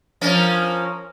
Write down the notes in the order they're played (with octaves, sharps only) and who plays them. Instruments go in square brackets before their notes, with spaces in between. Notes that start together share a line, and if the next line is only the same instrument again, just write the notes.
[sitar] F3 A#3 C#4